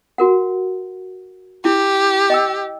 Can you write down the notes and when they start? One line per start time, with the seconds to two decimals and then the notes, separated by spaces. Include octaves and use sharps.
0.18 F#4 A#4 F#5
1.65 E4 G4
2.30 D#5 G5 E6